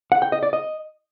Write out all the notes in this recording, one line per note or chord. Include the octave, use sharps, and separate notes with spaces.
F#5
G5
D#5
D5
D#5